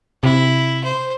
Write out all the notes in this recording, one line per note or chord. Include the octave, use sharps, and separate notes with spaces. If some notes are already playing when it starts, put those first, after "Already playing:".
C3 E4
C5